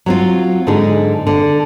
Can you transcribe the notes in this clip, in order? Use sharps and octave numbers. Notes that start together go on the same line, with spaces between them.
F#3 C4 F4
G#2 D3 G#3 D#4 G#4
D3